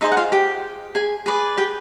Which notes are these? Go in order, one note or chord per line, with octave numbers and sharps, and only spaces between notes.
D#4 G#4 C5 D#5 E5
F#5
F4 F5
G4 G5
G#4 G#5
G#4 B4 D5
G4 G5